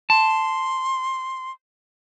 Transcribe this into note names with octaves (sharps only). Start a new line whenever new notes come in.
A5 C6